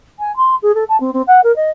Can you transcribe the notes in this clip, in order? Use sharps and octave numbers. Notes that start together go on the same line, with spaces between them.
G#5
C6
G#4
A4
A5
C4
C4
F#5
A#4
D#5